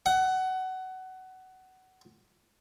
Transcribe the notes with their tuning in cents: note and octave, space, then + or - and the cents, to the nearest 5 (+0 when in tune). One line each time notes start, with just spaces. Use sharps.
F#5 +20